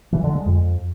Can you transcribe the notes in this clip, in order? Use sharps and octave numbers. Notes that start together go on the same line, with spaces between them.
E3
D3
G#3
F2